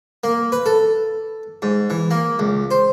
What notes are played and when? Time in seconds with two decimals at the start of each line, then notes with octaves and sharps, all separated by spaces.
0.24 A#3
0.52 B4
0.66 A4
1.62 G#2
1.90 E3
2.11 A#3
2.39 C#2
2.71 C5